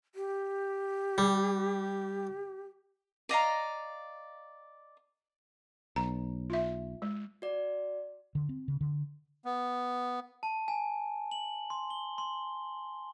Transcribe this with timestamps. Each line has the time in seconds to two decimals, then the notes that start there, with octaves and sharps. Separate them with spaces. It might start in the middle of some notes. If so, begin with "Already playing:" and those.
0.15 G4
1.18 G3
3.29 D5 D#5 F5 A#5
5.96 B1 A#5
6.50 F4 E5
7.02 G#3
7.42 F#4 D5
8.35 D3
8.49 C4
8.68 C#3
8.81 D3
9.45 B3
10.43 A5
10.68 G#5
11.31 F#7
11.70 C6
11.90 G7
12.18 C6